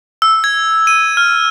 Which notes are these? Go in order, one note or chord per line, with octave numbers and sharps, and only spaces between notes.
E6
G#6
D#7
F6